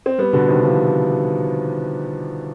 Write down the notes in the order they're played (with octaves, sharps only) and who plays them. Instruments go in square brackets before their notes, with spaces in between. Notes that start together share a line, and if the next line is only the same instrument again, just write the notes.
[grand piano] C4
G3 B3
B2 D3
C3 D#3
D3 F3